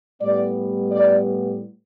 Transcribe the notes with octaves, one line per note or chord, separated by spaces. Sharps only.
A2 G3 B3 D5
D5